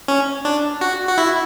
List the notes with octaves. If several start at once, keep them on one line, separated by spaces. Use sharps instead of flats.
C#4
D4
F#4
F#4
E4